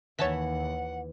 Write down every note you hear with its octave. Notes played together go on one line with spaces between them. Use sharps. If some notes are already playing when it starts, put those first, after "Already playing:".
D#2 E3 C#5 F#5 A5 B6